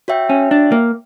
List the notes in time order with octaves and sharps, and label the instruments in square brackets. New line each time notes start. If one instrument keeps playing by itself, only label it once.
[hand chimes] F#4 C#5 E5 G5
[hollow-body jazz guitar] C#4
D4
A#3